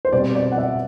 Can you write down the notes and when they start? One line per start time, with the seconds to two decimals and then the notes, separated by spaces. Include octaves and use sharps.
0.05 C5
0.13 B2 G3 C4 D5
0.35 D5
0.52 F#5
0.58 E5